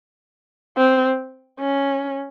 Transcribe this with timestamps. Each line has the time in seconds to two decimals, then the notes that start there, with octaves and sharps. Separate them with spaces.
0.77 C4
1.60 C#4